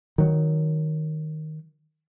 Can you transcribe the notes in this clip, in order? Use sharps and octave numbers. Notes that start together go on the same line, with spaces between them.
D#3 F#3